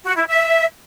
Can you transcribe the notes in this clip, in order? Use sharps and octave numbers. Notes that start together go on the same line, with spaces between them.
F#4
E4
E5